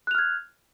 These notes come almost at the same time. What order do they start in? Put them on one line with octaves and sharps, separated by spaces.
F#6 F7 F6 G#6